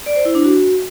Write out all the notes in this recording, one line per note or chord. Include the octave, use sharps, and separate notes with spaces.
D5
C5
E4
D4
F#4